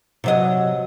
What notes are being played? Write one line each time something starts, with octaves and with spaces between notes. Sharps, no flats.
C3 F#3 D#5